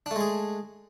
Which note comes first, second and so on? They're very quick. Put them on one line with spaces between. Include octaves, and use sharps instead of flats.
D4 A3 G#3 G#4